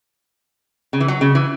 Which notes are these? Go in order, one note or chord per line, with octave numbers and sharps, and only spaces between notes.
C#3
E3
F#3
C#3
E3